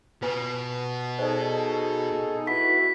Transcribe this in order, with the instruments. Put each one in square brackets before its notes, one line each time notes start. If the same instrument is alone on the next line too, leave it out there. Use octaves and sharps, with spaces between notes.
[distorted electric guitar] B2 [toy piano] F4 B4 G#5
[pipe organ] D#4 G#4 A4 [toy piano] C5 D5
[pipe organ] E4 F#4 B4 [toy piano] C#6 [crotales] B6